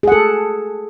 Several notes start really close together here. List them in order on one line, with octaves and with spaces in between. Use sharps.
G#4 F#5 A4